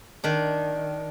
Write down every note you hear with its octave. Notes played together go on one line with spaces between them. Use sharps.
D#3 D4